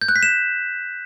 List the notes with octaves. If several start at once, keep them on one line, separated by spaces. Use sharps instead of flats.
G6
F#6
B6
E7